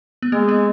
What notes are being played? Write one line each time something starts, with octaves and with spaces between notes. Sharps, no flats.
B3
G#3 A#3
B3